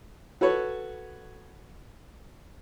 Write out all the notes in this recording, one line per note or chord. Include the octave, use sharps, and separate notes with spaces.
F#4 A4 B4 C#5